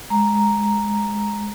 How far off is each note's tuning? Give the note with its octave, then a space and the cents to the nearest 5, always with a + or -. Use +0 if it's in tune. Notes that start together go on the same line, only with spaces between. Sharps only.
G#3 +0 A#5 +0